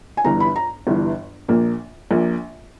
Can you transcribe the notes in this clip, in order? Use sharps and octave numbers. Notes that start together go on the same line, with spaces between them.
G#5
G1 G2 E3 A#5
B5
A#5
G1 G2 E3
A#1 A#2 A#3
A#1 A#2 A#3